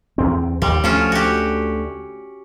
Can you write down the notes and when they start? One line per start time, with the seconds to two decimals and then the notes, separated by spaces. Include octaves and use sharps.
0.18 E2 C4
0.62 D#2 G3
0.84 D2 F3 A3 C#4 F4
1.12 F#4 G4